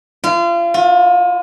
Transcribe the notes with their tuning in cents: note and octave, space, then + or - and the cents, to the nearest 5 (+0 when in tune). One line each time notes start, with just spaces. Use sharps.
F4 -35
F4 +35